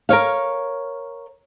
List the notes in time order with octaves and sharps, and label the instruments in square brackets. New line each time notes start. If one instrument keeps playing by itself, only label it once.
[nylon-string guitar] A#4 B4 C#5 F5